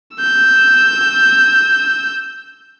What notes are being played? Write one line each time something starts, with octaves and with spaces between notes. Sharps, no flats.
E6 G6